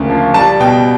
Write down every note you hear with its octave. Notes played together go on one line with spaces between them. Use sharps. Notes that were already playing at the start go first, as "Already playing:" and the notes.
Already playing: D2 C#3 A#3
F3
G3 A5
B2 G5